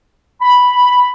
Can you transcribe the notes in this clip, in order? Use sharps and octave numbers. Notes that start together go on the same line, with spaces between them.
B5